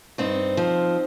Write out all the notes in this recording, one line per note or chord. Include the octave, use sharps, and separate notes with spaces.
G2 C4 D#4
F3